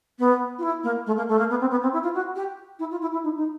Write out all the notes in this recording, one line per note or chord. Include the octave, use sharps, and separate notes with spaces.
B3
F4
E4
A#3
A3
A#3
A3
A#3
B3
C4
B3
C4
E4
F4
F#4
G4
E4
F4
E4
E4
D#4
D#4